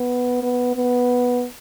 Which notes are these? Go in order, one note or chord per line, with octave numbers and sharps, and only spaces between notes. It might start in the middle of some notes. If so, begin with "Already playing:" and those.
Already playing: B3
B3
B3